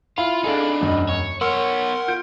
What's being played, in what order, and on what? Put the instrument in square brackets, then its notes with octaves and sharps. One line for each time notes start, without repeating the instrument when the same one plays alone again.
[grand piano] E4 F5 [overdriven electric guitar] F4 [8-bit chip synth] B5
[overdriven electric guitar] D4 D#4 [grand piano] G#4 A4 F5
[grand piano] E1 F#2 D#5
[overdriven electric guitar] C#5
[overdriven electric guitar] B3 C#5 [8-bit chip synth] A#4 F#5 C6 [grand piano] E6
[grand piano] F4 G6 D7